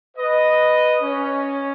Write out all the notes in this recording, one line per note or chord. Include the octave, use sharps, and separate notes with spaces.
B4 D#5
C#4